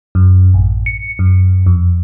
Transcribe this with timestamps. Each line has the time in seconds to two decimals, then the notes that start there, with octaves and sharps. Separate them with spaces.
0.15 F#2
0.54 A1
0.86 C#7
1.19 F#2
1.66 F2